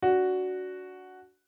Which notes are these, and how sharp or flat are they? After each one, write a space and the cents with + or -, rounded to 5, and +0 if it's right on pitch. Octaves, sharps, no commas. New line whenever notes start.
D4 -20 F#4 +0